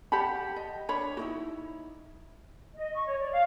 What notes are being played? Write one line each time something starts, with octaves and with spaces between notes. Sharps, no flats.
G4 F#5 A5 B5
D#5
D4 C#5 B5
D#4 E4 F#4
D#5
C#6
C#5
D5
F5